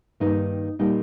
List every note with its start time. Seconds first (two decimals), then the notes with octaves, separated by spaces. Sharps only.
0.20 G2 D#3 A#3 D#4
0.79 A#2 G3 A#3 D#4